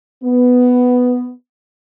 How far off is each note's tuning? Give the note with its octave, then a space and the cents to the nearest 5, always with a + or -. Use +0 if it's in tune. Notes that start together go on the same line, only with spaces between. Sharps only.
B3 +5